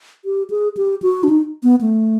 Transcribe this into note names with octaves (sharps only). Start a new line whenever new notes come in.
G4
G#4
G4
F#4
D4
D#4
B3
A3